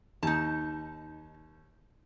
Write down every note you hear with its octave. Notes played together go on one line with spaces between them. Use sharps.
D#2 D#4 A5